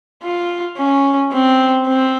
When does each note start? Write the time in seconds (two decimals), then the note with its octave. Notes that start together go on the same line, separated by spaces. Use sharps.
0.23 F4
0.78 C#4
1.32 C4
1.87 C4